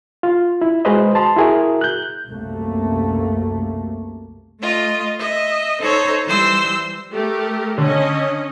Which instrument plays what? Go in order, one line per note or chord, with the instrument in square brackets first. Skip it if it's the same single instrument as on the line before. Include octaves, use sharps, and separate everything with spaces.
[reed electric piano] F4
E4
G#3 F#4 G#4 B4 C5 D#5
A5 C6
E4 F#4 G#4 A#4 E5
F#6 G6
[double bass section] C2 F#2 C3 A3 A#3
[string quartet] A3 F4 D#5
D#5 E5
D#4 A4 C5 C#5
E3 G3 C5 C6 E6
[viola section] A3 G4 A#4
[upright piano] D3 [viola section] C#4 D#5